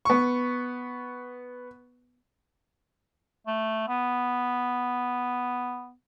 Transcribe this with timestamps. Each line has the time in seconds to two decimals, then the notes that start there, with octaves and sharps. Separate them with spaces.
0.05 B3 C#6
3.47 A3
3.88 B3